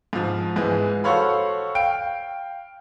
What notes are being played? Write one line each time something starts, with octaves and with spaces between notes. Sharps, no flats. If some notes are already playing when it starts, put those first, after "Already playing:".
G#2 F3
G#2 E3 G#3
F#4 A4 C5 C#5 F5 B5
F5 G5 D7